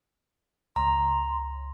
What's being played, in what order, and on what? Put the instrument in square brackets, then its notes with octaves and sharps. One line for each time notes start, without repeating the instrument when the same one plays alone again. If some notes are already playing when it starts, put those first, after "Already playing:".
[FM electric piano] C#2 [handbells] A#5 [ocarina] C6